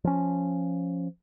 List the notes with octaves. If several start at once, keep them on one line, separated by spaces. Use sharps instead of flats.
F3 C#4